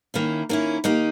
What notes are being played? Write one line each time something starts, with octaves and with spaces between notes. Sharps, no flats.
D#3 A#3 C#4 E4
D#3 A#3 C#4 E4
D#3 A#3 D#4 G4